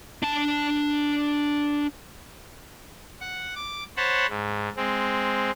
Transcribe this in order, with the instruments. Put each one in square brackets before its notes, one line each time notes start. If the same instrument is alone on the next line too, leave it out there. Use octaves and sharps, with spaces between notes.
[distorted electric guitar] D4 A5
[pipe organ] F#5
D6
C5 C#5 F#5 A5 B5
G#2
G#3 C4